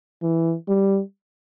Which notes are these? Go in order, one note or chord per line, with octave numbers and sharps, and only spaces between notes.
E3
G3